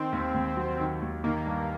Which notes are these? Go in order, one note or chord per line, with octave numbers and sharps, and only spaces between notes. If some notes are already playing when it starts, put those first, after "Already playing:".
Already playing: D#3 C4
D#2
D#2
F#3
D#3
D#2
D#3 A#3
G2